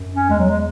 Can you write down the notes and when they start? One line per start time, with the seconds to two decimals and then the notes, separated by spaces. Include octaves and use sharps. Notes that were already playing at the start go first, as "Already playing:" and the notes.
Already playing: F#2
0.15 C#4
0.29 E2 G#3
0.40 F#3
0.49 G#3